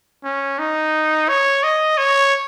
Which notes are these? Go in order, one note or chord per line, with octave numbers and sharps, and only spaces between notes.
C#4
D#4
C#5
D#5
C#5